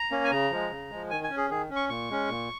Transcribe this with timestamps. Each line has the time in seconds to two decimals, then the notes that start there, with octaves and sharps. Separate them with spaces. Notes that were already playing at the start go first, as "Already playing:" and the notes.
Already playing: A#5
0.11 A#3 C#4
0.24 G#5
0.31 C#3 A#5
0.51 F3 G#3
0.70 C#3
0.91 F3 G#3
1.10 D#3 G#5
1.24 G#5
1.30 C#4
1.37 G#4
1.50 D#3 G#4
1.70 C#4
1.76 C#6
1.89 A#2 C#6
2.10 G#3 C#4
2.29 A#2